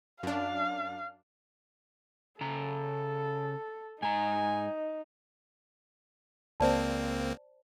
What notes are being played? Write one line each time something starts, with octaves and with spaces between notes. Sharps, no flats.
F#2 D4 F5
C#3 A4 A#5
G#2 D#4 G#5 A#5
C#2 A#3 C4 C5 D5 A5